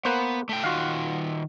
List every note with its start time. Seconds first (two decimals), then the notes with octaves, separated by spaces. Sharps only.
0.05 A#3 B3 B4 C5
0.49 A3 G5
0.64 D#3 F4 F#4 F5